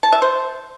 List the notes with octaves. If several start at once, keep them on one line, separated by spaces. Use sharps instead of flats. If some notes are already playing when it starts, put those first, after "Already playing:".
A5
E5
C5